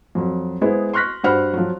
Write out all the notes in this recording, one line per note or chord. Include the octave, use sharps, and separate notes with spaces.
F2 F#3
G#3 B3 E4 G#4 C5
C6 C#6 F6 F#6 A#6 B6
G2 F#4 C5 F#5 B5 F6
F3 F#3